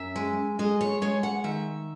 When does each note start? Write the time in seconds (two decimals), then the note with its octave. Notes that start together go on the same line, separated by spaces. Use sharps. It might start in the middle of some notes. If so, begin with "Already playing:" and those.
Already playing: F#2 E5
0.16 G#3
0.59 G#3 D#5
0.81 C#5
1.02 G#3 C#5
1.23 F#5
1.44 D#3 E5